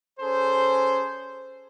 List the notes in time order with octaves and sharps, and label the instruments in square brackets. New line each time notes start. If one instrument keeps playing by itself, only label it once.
[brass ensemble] C#4 G#4 A4 C5